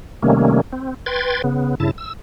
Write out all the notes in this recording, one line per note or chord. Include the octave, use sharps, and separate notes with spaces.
C3 D#3 G3 A3 A#3 C#4
C4
B4 G5 C6 G#6 A6
C#3 B3
G2 C#3 E4 A5
E6